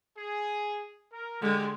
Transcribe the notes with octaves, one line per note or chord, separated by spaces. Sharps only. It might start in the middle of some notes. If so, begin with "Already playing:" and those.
G#4
A#4
D3 G#3 G4